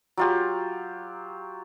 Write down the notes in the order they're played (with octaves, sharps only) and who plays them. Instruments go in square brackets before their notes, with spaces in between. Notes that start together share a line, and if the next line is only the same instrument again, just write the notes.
[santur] F#3 F4 G4